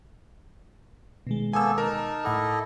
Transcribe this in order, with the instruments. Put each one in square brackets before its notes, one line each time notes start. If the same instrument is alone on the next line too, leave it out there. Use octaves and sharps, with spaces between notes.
[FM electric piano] B2 D#3 G#3
[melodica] A#3 B3 A4 [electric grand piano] G#5 E6
[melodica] D#4 A5 [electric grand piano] A#4
[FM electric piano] A2 F#5 D6 [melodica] E4 A4 D#5